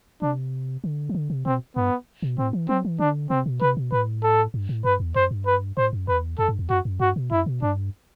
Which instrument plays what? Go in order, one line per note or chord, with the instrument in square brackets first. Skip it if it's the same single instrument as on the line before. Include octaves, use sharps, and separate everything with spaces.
[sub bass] C3 [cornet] D4
[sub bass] D3
E3
D3
C3
[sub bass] B2 [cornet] C4
[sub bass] G2 [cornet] B3
[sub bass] B2
[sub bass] A2 [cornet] C4
[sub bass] E3
[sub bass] F#3 [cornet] C4
[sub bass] E3
[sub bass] D3 [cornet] D4
[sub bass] C3 [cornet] C4
[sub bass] B2
[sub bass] C3 [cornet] B4
[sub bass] B2
[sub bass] A2 [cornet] B4
[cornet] A4
[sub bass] G2
A2
[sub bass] G2 [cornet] B4
[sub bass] E2
[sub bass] F#2 [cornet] C5
[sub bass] G2
[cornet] B4
[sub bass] A2 [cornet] C5
[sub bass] F#2
[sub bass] E2 [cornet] B4
[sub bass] F#2 [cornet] A4
[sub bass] G2
E2
[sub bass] F#2 [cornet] F#4
[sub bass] F#2
[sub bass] G2 [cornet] F#4
[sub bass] B2
[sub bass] F#2 [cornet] E4
[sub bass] B2
[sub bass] G2 [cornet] D4